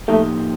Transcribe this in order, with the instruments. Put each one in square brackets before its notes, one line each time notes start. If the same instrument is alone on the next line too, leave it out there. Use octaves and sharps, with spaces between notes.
[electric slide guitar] A2 F3 A#3 D#4 G4 [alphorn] A3